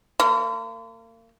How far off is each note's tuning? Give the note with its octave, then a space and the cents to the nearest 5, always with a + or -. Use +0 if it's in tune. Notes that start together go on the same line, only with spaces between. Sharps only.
A#3 -40 C6 -45